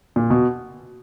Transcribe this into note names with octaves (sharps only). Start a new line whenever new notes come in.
A#2
B2